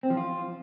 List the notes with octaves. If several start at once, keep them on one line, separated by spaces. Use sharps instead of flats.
C4
F3
F4